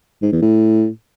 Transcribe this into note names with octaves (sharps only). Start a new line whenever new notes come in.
G#2
E2
A2